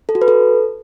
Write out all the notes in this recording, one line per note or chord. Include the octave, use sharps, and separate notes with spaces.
A4
F#4
B4
A4